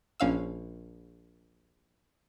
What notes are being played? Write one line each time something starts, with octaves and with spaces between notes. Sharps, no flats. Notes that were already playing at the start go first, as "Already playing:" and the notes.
A#1 C#4 F5 E6